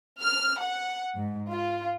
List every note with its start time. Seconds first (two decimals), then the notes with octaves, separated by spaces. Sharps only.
0.20 F6
0.59 F#5
1.16 G#2
1.52 F4